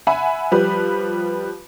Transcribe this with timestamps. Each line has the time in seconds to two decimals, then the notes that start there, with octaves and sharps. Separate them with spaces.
0.07 E5 F#5 G#5 B5
0.52 F3 G3 B4